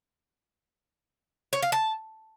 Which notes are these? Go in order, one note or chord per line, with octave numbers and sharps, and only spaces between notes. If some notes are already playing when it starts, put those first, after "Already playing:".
C#5
F5
A5